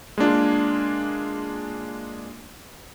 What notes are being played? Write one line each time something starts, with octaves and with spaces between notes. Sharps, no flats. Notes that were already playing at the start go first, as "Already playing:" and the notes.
G#3 A#3 D4 F4